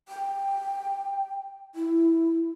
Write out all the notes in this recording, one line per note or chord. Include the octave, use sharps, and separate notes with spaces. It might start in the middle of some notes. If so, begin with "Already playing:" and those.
G5
E4